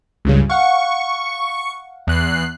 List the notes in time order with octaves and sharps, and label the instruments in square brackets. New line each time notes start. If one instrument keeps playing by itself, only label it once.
[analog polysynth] C#2 G2 C#3
[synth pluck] F5 F#5 [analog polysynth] C#6
[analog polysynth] E2 F#6 C7